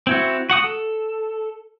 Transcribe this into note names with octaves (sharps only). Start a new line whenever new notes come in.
C4 E4 F#4
F#4 F#5 D#6
A4